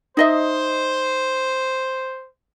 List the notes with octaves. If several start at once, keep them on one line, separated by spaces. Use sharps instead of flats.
D#4 C5 D#5 E5